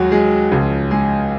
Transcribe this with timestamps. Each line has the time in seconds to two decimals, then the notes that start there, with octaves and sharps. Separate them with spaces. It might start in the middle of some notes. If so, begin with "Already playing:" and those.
Already playing: D#2 F#3 G#3 F#4 G#4
0.11 G#3 G#4
0.51 C#2 C#3 F3
0.91 G#3 G#4